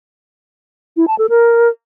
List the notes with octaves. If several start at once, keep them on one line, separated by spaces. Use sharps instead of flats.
E4
A5
A4
A#4